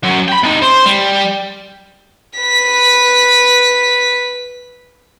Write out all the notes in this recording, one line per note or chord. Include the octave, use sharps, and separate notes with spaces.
F#3 C#4
G5 B5
C3 D#4
C5
G3
B4 B6